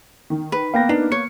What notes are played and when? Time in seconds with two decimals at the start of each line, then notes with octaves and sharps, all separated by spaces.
0.30 D#3
0.52 B4
0.74 A#3 B3 F5 G5 A#6
0.89 D4 D#4 B4
1.12 C#5 C#7